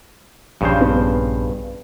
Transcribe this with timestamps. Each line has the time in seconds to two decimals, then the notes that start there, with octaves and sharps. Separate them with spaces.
0.61 A#1 G2 C#3 F3 C5
0.81 B3